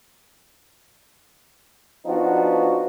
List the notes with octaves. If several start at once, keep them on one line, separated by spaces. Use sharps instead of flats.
F3 B3 D4 D#4 F4 F#4